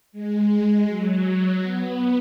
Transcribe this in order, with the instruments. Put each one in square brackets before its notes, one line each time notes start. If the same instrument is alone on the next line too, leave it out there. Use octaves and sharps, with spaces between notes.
[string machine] G#3
F#3
B3